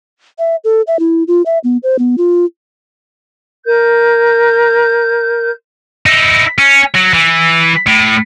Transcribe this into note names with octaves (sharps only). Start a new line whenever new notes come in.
E5
A4
E5
E4
F4
E5
B3
C5
B3
F4
A#4 G6
D#4 E4
C#4
F#3
E3
A2